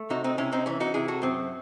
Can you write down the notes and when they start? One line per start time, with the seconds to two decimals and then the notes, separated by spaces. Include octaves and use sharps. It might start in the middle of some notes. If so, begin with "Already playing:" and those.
Already playing: A3
0.10 C3 D#4 F#4
0.24 C4 D#4
0.38 C3 C#4 E4
0.52 C4 D#4
0.66 E3 C#4
0.80 D#4 F#4
0.94 C3 E4 G#4
1.08 F#4 A4
1.22 F#2 C4